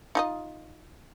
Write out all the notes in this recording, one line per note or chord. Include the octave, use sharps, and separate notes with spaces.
D#4 F4 D#5